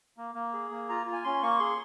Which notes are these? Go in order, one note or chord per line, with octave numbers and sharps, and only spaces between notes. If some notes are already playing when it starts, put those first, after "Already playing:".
A#3
A#3
G#4
A#3
F4 A#5
F4
G#5
C#4 C6
A#3 C#6
G#4 C6